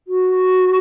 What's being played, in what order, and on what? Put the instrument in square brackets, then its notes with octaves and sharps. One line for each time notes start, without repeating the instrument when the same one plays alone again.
[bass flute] F#4